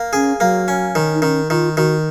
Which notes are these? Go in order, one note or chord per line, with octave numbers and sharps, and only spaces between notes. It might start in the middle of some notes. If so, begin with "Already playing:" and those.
Already playing: A#3
C#4 G#4
F#3 A#3
C#4
D#3
D#4
D#3 C#4
D#3 F4
D#3 F#4